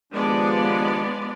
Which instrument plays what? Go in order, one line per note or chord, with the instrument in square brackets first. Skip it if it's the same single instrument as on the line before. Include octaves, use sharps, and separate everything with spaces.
[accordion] D#2 F3 D4 [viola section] G#3 B3 D5